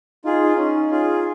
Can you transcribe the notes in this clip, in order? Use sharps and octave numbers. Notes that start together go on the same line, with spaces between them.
D#4 F4 G#4
C#4 D#4
F4 G#4